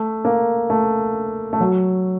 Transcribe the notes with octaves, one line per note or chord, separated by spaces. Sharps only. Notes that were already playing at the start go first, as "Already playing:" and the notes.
Already playing: A3
A#3
A3
A3
F#3